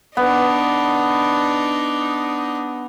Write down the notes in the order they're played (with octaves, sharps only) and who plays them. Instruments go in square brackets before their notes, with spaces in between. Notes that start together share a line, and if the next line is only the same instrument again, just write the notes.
[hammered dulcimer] B3 [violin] D4 D#4